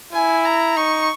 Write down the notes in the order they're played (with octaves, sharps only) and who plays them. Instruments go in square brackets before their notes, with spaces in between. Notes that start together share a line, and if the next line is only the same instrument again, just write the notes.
[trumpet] E4 [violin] G#5
[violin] A#5
[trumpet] D#4 [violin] C#6